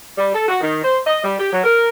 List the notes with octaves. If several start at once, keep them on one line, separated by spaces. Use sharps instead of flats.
G3
A4
F#4
D#3
C5
D#5
G3
G4
F#3
A#4